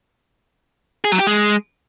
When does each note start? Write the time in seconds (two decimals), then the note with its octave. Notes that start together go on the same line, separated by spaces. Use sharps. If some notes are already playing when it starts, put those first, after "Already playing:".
1.04 G#4
1.12 F#3
1.19 G4
1.27 G#3